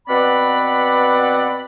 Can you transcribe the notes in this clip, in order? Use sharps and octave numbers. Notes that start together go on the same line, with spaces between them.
B2 C4 B4 D5 F#5 B5